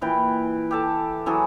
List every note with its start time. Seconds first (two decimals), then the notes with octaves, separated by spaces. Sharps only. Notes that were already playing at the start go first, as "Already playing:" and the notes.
0.01 A#2 E3 G5 B5
0.71 G4 A4 A5
1.26 E3 F#3 G#4 A4